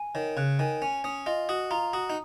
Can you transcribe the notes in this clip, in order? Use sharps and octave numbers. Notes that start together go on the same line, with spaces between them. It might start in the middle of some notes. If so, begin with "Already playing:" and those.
Already playing: G#5
D#3 C#5
C#3 F#6
D#3 G#5
C#4 G#5
C#4 D#6
F4 D#5
F#4 D#6
F4 A#5
F#4 D#6
D#4